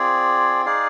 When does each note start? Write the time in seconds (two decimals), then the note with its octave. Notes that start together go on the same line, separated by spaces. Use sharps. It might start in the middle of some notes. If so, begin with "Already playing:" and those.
Already playing: C4 F4 G#4 D5
0.66 D#4 G#4 D5 F5